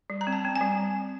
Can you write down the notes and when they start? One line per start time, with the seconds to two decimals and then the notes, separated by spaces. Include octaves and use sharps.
0.10 G3
0.21 A#5
0.27 C4
0.33 A5
0.45 C4
0.55 G#5
0.61 G3